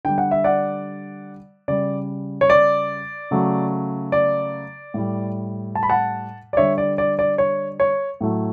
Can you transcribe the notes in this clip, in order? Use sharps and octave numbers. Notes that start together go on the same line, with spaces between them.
D3 G3 G5
F#5
E5
D5 F#5
C#3 G3 D5
C#5
D5
C#3 F#3 A3
D5
A2 G3
A5
B5
F#5 A5
D5
D3 G3 C#5 E5
D5
D5
D5
C#5
C#5
A2 F#3 A3